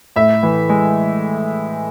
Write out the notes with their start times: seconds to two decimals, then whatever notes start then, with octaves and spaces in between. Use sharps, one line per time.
0.16 A2 E5
0.43 E3
0.69 G#3